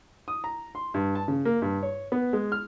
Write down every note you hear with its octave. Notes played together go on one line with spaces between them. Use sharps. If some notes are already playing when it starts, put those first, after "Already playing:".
D#6
A#5
C6
G2
A5
C#3
A#3
G2
C#5
B3
G#3
F6